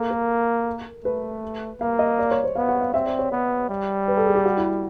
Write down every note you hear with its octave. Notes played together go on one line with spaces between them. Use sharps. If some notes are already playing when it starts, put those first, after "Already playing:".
Already playing: A#3 A4
A#4
A3 B4
A#3 F5
D#5
D5
C#5
C5
B3 F5
F#5
F5
C4 E5
D5
C#5
B3 B4
G3
B4
A4
G#4
G4
F#4
E4